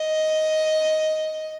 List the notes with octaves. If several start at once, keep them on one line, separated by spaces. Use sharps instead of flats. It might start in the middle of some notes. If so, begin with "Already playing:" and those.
Already playing: D#5